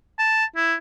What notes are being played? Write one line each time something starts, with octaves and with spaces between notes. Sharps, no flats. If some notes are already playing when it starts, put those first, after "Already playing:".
A5
E4